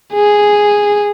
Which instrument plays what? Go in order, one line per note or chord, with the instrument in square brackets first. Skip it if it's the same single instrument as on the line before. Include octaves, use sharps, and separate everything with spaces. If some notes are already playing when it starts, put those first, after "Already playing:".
[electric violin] G#4